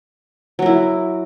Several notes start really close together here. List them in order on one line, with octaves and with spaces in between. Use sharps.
F#3 A#4 E4